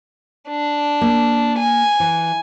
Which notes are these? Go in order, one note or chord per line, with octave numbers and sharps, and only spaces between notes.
D4
A#3
G#5
E3